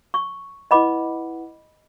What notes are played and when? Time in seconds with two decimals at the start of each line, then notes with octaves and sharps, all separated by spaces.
0.14 C#6
0.71 E4 B4 D#5 F#5 B5 D6